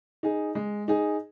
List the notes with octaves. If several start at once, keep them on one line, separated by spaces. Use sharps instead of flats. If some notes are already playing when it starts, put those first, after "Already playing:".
D#4 G#4
G#3
D#4 G#4